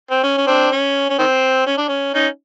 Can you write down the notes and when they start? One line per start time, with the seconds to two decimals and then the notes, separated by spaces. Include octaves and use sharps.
0.11 C4
0.23 C#4
0.38 C#4
0.47 C4 D4
0.72 C#4
1.10 C#4
1.19 D#3 C4
1.67 C#4
1.78 D4
1.88 C#4
2.14 C#4 D#4